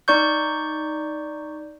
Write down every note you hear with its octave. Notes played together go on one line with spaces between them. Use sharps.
D#4 D5 C#6 G6